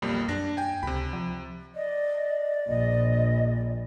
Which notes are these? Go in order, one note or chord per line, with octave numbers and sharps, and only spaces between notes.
B1 F2 G3 A#3
F#2 D4 A#6
G5 G#5
C#2 C3 B5
F3
D5 D#5
A#1 D#5